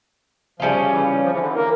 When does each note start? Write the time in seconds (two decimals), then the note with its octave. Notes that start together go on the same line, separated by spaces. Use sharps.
0.60 C#3 F3 G3 C#4 F4
0.92 E3
1.23 F3
1.32 E3
1.39 D3
1.47 E3
1.55 A#3